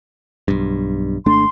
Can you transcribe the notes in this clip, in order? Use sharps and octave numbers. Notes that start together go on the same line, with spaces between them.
B1 G2
G#1 A3 D4 C6